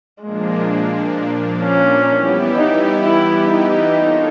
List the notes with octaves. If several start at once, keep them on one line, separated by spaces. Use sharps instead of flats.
A#2 F3 G#3 A#3 D4
C#4
E3 G3 B3 E4 G4
D#4
E4
D#4
A#3 D4 F4 A4 C#5